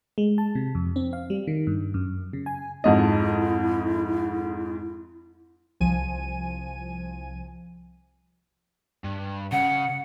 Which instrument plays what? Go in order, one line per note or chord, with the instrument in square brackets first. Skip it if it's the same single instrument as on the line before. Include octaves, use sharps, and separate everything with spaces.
[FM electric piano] G#3
A5
C3
F2
C4
F5
G3
D#3
G2
F#2
C#3
G#5
[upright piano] F2 G#2 D#5 [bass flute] E4
[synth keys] C2 F3 G#5 D#7
[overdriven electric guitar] G2
[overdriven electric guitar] C#3 [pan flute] F#5